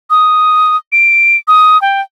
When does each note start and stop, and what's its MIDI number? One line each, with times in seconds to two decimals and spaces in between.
0.10 0.77 87
0.92 1.37 98
1.48 1.80 87
1.82 2.01 79